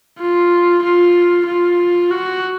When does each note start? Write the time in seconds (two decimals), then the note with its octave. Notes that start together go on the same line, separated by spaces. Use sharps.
0.19 F4
0.83 F4
1.46 F4
2.11 F#4